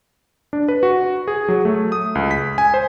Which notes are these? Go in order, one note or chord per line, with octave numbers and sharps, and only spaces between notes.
D4
B4
F#4
G#4
F#3
A3
D#6
C#2
B6
G#5
C5